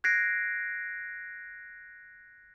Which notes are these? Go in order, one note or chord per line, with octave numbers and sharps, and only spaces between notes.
F#6 G#6 A#6 C7 D7